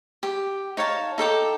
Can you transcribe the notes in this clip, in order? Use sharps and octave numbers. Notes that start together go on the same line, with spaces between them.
G4
D#4 C#5 F5 A5
D#4 A4 G5 D6